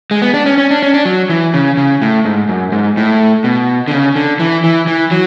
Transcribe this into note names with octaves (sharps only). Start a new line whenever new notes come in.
G#3
B3
D4
C#4
C#4
D4
C#4
D4
F#3
E3
C#3
C#3
A2
G#2
F#2
G#2
A2
B2
D3
C#3
D3
E3
E3
E3
F#3